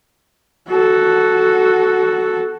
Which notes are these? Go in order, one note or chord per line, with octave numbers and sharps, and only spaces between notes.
F#4 A4